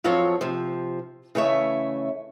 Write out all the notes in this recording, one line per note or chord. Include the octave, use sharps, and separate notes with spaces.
F2 F3 F#3 C4 F4 C#5
C3 F3
C#3 E3 A3 C#5 D#5 E5